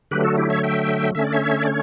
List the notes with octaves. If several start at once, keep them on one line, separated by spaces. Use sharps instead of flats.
D3 F#3 A3 G4 B4
F#4 A4
E4 G4
C#5 E5
E5 G5
D3 A3 C#4 E5
D5
C#5 E5
D5
C#5